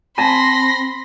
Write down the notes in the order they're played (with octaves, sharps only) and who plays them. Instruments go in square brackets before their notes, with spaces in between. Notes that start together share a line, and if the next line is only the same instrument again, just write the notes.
[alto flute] C4 [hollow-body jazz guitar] G#5 A5 [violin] B5 C6 [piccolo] A#6